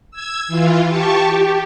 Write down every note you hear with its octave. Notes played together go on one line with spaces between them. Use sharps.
E6 G#6
E3 F4
G4 A5 C#6
G4